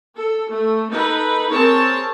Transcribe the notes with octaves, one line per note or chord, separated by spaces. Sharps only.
A4
A3
D#4 A4 B4
C4 G#4 A#4 C#5 A5